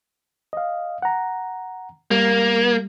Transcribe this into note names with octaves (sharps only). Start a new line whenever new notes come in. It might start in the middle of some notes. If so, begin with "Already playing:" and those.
D#5 F5
F#5 A#5
G3 A#3